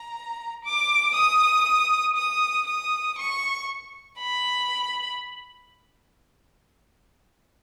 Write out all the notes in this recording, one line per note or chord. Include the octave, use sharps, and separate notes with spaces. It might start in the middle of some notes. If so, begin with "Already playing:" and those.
Already playing: A#5
D6
D#6
D#6
D#6
C#6
B5